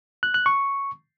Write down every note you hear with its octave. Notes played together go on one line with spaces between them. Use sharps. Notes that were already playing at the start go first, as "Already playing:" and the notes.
F#6
F#6
C#6